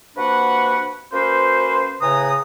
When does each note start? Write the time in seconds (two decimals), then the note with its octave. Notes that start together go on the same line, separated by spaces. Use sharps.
0.17 C3 A#3 D4 F#4 B4 F#5
1.13 A#3 C#4 F#4 B4 C5
2.01 A2 C#3 B4 G#5 A#5 D#6